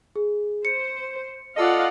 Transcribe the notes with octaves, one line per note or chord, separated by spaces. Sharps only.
G#4
C5 C#7
F4 A4 D5 D#5 F5 F#5